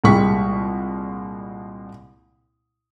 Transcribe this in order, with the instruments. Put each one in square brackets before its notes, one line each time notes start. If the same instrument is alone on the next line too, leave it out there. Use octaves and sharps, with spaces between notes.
[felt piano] C2 A#2 G3 G#3 C#6 B6